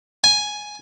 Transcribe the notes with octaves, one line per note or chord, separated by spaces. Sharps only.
G#5